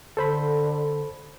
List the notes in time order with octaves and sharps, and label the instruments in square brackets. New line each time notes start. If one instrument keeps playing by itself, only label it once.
[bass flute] D3 [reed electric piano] A4 C5 B5